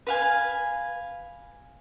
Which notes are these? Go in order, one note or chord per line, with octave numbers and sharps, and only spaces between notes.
B4 F5 G#5